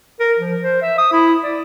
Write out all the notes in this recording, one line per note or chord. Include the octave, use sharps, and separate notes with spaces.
A#4
F3
C5
E5
D#6
E4
D5